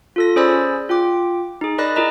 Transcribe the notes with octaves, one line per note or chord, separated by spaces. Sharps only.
F4 A4 A#6
C#4 G#4 C5 D5 B5 E6
F4 G5 D6
D#4 G#4
A#4 D5 D#5 B5 F#6 A#6
E4 G#4 A#4 D#5 A#5